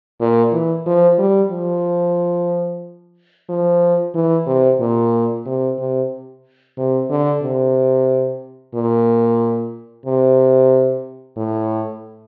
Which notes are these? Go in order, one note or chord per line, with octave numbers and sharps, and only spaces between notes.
A#2
E3
F3
G3
F3
F3
E3
C3
A#2
C3
C3
C3
D3
C3
A#2
C3
A2